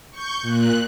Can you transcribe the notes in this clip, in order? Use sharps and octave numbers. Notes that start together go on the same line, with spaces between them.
C#6 G6
A#2 F#6